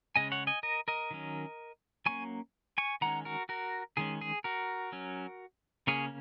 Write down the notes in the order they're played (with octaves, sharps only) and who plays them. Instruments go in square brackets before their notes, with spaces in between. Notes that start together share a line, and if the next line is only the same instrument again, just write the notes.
[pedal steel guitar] C#3 G#3 C#4 D#5 G#5
C#5 F#5
D#5 G#5
A#4 D#5
A#4 D#5
D#3 F#3 C#4
F#3 A#3 C#4 G#5 C#6
G#5 C#6
D#3 G#3 C#4 F#5 A#5
F#4 A#4
F#4 A#4
D#3 G#3 C#4 G#4
G#4
F#4 A#4
F#3 C#4
C#3 A#3 C#4 G#4 C#5